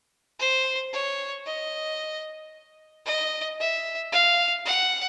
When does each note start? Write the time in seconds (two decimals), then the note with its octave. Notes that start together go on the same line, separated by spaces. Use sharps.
0.40 C5
0.93 C#5
1.46 D#5
3.06 D#5
3.60 E5
4.12 F5
4.66 F#5